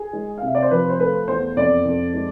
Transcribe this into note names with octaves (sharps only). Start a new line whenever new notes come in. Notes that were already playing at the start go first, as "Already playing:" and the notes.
Already playing: G#4
G#3
F5
C3 E5
D5
C5
F3 B4
C5
A3 B4
E2 C5
F2 D5
F2
G#3